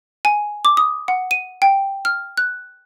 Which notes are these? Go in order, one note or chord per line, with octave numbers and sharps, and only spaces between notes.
G#5
D6
D#6
F#5
D#7
G5
F6
F#6